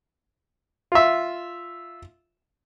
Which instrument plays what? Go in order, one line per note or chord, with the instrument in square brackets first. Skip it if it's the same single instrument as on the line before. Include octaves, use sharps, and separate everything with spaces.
[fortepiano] F4 E5